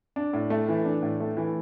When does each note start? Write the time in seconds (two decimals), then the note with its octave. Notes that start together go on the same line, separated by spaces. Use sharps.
0.16 D4
0.33 A2
0.50 A3
0.68 E3
0.85 D4
1.03 A2
1.20 A3
1.37 E3